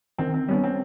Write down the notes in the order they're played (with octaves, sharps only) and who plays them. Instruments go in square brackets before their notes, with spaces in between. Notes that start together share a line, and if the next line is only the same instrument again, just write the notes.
[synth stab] D#3 [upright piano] C4
[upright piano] C4
[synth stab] G3 B3 D4 [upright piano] C#4
[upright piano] C4